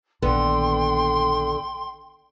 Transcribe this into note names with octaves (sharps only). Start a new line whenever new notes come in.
A#1 D3 D#3 B3 G5 C6